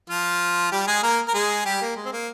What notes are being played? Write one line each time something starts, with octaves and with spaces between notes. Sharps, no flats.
F3 F4
G3 G4
G#3 G#4
A#3 A#4
A#4
G#3 G#4
G3 G4
A#3
G#3
C4
A#3